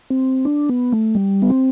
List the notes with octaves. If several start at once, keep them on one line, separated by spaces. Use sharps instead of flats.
C4
D4
B3
A3
G3
B3
C4